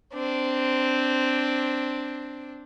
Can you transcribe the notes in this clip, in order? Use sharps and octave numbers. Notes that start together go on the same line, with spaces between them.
C4 D4